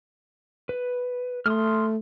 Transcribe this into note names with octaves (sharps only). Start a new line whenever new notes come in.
B4
A3 C6 D#6 F6